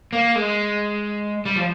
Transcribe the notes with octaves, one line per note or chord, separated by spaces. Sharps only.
A#3
G#3
G3
F3